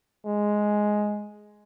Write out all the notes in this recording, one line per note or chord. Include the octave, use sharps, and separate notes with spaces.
G#3